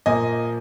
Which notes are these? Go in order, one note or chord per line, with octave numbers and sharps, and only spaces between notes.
A#2 F3 A#3 D#5 G#5